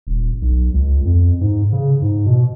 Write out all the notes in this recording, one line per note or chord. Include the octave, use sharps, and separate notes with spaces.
D#1
B1
C#2
F2
G#2
C#3
G#2
B2